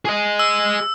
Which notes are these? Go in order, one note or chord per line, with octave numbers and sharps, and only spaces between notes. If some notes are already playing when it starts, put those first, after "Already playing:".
G#4 D#5
E6